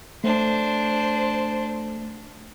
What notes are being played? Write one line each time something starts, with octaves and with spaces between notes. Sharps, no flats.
A3 D4 C5